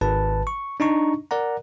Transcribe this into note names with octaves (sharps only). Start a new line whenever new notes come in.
G#1 B4 A5
C#6
D4 D#4 A#5 C#6
A#4 D5 F#5 A#5